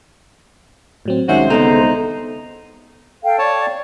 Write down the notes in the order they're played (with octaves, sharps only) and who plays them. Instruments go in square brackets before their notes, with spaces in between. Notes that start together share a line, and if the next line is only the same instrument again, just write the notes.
[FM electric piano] A2 F#3 C4
[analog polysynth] C2 G#3 C5 [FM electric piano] D#3 C#4 E5 [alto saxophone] F#4
[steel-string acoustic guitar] E2 D3 [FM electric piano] B3 [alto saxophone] D#4
[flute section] A4 F5 G5
[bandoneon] C#5 A5 [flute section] D5